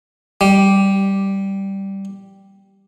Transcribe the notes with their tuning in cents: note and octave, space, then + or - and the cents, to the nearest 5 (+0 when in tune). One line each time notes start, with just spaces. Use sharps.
G3 -5